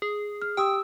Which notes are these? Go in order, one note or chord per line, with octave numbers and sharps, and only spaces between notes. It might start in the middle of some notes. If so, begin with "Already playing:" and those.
G#4
F6
G4 G5 D#6 E6